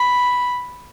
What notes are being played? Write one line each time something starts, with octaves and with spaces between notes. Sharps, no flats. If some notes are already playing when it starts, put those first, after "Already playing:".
Already playing: B5